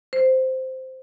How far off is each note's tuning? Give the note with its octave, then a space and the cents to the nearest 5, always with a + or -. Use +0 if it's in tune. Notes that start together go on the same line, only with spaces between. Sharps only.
C5 -5